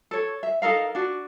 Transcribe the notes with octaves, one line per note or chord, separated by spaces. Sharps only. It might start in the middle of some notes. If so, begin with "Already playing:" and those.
A4 C#5
E5
D#4 A4 A#4 F5
D4 F#4